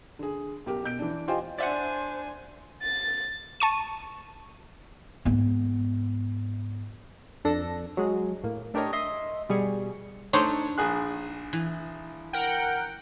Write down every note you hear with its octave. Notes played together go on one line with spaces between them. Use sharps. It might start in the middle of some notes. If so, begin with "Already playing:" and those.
D3 G#4
B1 G4 A#4
B2 G6 D7
E3 D4
F4 G4 C5 D#5 G5 G#5
D4 C5 D5 E5 F#5 G#5
A6
A5 C#6 D#7
G#2 B3
F2 D4 A4 A#6
F#3 G#3 G#4
A2 A#3
A3 D4 G4 A#4 C#5 D#5
D#5 E5 C6
B2 G3 G#4 C#6
A3 D4 D#4 C5 C#5
A#1 G#4 F#6
E3
A#4 F#5 G5